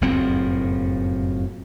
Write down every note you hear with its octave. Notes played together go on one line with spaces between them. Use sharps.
F#1 F2 A2 C4